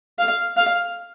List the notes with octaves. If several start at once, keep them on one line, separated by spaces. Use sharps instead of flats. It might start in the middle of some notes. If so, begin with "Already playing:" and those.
F5
F5